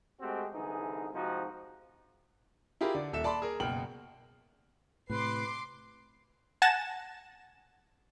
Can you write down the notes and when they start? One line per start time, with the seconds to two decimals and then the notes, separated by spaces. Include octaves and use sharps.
0.21 G#3 A3 C4 F#4 G4
0.53 C2 D3 E3 D#4 G#4
1.14 G#2 C3 F3 D#4 F#4
2.81 E4 F4 G4 G#4 A#4 B5
2.94 D3 D5
3.13 D#1 A4 E5 E7
3.24 D5 A5 B5 C6
3.42 G#4 A#4
3.60 F#1 B2 G5 F6 F#7
5.10 A2 C3 B4 C6 D6 C7
6.62 F#5 G#5 A5 A6 A#6 E7